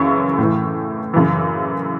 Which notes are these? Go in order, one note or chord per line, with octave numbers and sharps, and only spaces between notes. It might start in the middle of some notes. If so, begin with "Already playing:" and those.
Already playing: F#2 C#3 E3 C#6
A2
E3
F#2 C#3 E3